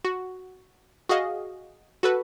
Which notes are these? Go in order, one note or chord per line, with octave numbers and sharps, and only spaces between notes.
F#4
F#4 G#4 D#5 F5
F#4 A4 B4